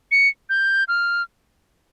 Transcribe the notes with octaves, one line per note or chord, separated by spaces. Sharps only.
C#7
G6
F6